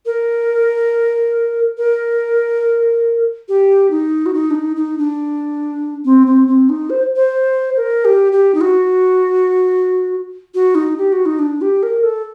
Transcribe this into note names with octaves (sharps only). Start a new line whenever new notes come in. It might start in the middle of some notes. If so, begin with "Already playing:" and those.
A#4
A#4
G4
D#4
F#4
D#4
D4
D#4
D#4
D4
C4
C4
C4
D#4
C5
C5
A#4
G4
G4
D#4
F#4
F#4
D#4
G4
F#4
D#4
D4
G4
A#4
A4